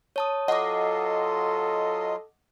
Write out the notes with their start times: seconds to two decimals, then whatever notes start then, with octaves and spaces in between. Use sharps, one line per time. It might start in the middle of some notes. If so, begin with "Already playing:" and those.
0.16 C#5 A5 D#6
0.48 F#3 F4 A4 D#5 F#5 C6 D6